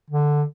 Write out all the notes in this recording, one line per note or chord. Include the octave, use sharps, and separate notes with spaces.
D3